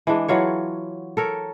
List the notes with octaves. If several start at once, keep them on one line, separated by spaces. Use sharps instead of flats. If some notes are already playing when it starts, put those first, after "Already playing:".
E3 G#3 D4
E3 F#3 F4 C#5
A4 A#4 C#5